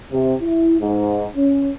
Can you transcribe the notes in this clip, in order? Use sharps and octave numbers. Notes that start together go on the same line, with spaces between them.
C3
E4
G#2
C#4